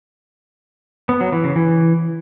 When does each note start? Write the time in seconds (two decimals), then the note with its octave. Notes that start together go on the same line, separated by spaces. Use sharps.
1.09 B3
1.21 F#3
1.32 E3
1.44 C#3
1.56 E3